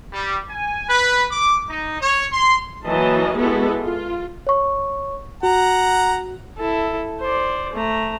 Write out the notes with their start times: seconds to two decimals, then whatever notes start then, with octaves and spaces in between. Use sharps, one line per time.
0.13 G3
0.49 G#5
0.89 B4
1.31 D6
1.69 D#4
2.01 C#5
2.32 C6
2.86 E3 F#3 A#3 D#5 A5
3.37 G#3 B3 E4 F#4 G4 A4
3.82 F4
4.47 C#5 C#6
5.43 F#4 F#5 A#5
6.58 E4 A4
7.21 C5 D5
7.73 A3 A#5